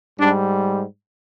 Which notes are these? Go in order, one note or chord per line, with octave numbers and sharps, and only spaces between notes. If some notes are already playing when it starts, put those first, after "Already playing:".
G#2 G3 D4